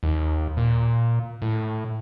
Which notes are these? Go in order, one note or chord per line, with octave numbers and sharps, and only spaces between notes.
D#2
A#2
A2